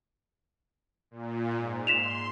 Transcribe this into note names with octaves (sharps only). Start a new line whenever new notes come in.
A#2
G#2
C6 B6 E7 F7